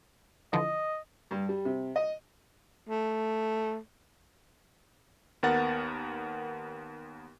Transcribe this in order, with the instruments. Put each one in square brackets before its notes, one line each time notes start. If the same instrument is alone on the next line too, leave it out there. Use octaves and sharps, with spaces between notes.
[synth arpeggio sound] D3 E3 F3 [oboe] D#5
[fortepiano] G2
G3
C3
D#5
[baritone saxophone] A3
[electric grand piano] D#2 B3 A#4 F#5 A6